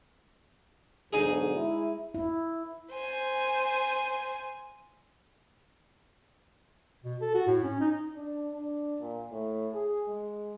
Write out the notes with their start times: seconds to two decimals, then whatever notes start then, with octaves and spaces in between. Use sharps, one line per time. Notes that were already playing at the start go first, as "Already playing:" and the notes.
1.13 B1 G#2 D3 D#4 G#4
1.55 G#3 E4
2.14 E4
2.92 C5 G#5
7.04 B2
7.21 A4
7.34 F#4
7.47 A2
7.64 C#4
7.80 D#4
8.16 D4
8.54 D4
9.01 A#2
9.31 A2
9.74 G#4
10.08 G#3